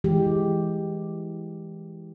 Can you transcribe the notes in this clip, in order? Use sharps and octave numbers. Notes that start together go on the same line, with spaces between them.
E3 G#3 G4